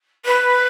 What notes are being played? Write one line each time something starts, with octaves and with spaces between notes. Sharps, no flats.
B4